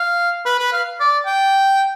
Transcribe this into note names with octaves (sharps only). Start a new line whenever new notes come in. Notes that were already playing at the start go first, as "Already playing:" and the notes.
Already playing: F5
B4
B4
F5
D5
G5